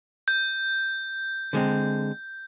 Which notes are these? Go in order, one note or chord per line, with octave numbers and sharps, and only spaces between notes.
G6
D3 G#3 C4